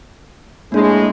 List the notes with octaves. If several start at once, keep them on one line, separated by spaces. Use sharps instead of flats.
A2 G#3 A#3 D4 E5